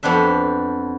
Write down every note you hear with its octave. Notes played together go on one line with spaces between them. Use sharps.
F2 B3 C4 D4 E5